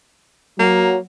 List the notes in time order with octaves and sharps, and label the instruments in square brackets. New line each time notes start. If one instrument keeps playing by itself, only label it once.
[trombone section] F#3 [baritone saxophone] A#3